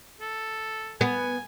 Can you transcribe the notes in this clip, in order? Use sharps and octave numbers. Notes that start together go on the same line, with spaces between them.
A4
B3 G#5